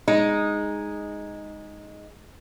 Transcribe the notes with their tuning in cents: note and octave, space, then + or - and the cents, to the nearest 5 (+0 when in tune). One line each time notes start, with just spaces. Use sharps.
G#3 -5 D#4 +0